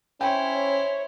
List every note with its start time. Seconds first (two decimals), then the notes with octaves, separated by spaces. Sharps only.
0.21 C#4 E4 C5 C#5 G5